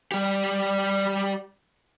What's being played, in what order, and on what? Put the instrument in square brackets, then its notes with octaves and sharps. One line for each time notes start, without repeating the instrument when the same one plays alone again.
[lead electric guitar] G3 G4